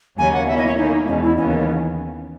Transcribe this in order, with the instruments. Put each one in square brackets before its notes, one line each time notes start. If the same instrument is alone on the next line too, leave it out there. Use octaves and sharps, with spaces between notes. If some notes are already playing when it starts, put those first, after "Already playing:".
[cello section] D#2 C#3 F#3 A#3 C#4 [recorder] G#5
[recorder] F#5
[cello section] B2 A#3 C#4 E4 [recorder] E5
[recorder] D#5
C#5
[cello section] D#3 A#3 E4 [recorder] D#4
[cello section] E2 B2 G#3 [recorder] C#4
[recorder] E4
[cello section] D#2 C#3 E3 B3 [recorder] C#4